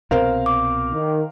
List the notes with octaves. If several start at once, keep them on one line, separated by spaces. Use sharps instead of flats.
C2 B2 C4 A#4 C5 F5
D6
D#3